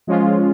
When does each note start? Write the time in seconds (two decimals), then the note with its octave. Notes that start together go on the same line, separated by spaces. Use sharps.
0.07 F3 G#3 C#4 F4